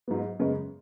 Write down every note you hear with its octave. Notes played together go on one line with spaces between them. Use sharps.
G#2 F#3 B3
F#2 C#3 G#3 B3